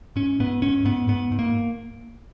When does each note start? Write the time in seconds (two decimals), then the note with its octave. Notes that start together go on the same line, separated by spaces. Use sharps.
0.16 G#2 C#4
0.40 G#2 B3
0.62 G#2 C#4
0.85 G#2 B3
1.08 G#2 B3
1.32 G#2
1.39 A#3